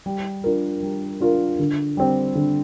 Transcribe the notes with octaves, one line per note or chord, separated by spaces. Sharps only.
G3
D4 F4 A#4
G3
D4 F4 A#4
D3
G3 C4
D3